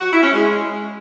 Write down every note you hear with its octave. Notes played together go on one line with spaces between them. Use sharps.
F#4
E4
C#4
G#3